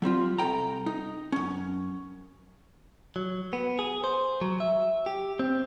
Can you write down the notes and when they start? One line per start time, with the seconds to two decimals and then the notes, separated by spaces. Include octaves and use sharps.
0.02 F#3 G3 C4 F4
0.38 C2 A#2 A4 G5 A#5
0.86 D#4
1.32 F#2 C#4
3.16 F#3
3.53 B3
3.79 G#4
4.04 C5
4.41 F#3
4.60 E5
5.06 G4
5.39 C4